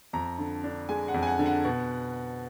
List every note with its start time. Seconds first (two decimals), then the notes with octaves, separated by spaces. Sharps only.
0.13 F2 A#5
0.39 D3
0.64 D4
0.89 G#3 G#5
1.08 F#5
1.14 F2
1.23 G#5
1.27 F#5
1.39 D3
1.46 F#5
1.65 B2